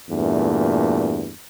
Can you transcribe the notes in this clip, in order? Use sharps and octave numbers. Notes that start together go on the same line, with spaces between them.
E2 G2 A#2 A3